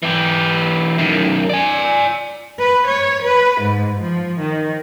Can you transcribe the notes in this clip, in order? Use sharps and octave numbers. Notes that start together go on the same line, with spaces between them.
E3 G4
F#2 D#3
D5 G#5
B4
C#5
B4
G#2
F3
D#3